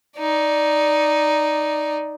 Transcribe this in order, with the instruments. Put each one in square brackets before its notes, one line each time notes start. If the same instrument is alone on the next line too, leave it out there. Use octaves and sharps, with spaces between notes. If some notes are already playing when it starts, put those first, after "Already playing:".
[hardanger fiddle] D#4 D5